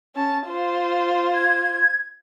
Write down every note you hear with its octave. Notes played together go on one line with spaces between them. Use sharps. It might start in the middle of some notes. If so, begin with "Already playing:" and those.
C#4 A5
F4 C5
G#6